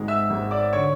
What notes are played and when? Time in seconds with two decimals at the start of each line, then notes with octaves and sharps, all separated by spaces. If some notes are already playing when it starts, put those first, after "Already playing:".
Already playing: G#1 G#2 G#3
0.08 E5 E6
0.30 G#1 G#2 G#3
0.51 D5 D6
0.73 D3 C#5 C#6